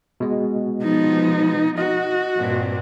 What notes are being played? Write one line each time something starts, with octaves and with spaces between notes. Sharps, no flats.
B2 G#3
F3 B3 D#4
F#4 D#5
G2 A#2 C4